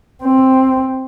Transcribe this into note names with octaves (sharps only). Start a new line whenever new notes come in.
C4